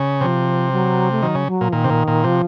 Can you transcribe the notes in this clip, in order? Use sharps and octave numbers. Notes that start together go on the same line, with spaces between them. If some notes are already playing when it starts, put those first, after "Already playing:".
Already playing: C#3
C3 F3
F#3
A3
D#3 F#3
C#3
F#3
A#2
F3
A#2 D#3
C3
A#2
A#2
C3 F3